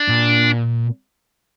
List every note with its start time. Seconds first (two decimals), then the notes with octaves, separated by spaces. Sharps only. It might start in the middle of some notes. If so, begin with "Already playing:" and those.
Already playing: D4
0.08 A#2